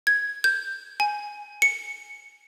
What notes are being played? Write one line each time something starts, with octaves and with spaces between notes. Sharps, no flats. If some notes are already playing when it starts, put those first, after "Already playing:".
G#6
G6
G#5
C#7